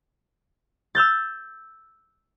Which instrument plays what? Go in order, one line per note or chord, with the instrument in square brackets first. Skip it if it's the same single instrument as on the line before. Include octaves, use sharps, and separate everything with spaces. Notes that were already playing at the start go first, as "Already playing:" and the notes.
[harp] E6 F6 G6 A6